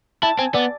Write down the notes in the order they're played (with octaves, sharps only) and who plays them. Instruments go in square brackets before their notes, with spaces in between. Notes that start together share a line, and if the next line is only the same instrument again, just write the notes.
[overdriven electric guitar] E4 [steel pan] A5
[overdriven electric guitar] C4 [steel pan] G#5
[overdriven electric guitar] B3 [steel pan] D5